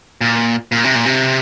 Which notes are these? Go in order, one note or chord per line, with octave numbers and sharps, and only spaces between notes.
A#2
A#2
C3
A#2
C3